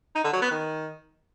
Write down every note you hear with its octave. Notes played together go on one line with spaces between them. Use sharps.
D#4
D3
F#3
B3
D#3